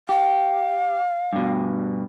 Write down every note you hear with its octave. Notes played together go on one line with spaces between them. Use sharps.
G4 F5
G2 B2